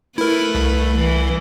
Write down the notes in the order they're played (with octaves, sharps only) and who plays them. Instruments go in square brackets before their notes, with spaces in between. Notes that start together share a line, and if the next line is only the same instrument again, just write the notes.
[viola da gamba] A3 B4 [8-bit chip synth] E4 A#4
[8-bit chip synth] C2
[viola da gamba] E3